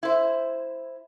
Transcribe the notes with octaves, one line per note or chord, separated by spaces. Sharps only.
E4 C5